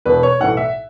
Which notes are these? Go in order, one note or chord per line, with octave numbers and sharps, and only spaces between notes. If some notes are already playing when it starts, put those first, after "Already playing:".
E1 E2 B2 B4
C#5
B1 A2 E3 G3 F#5
E5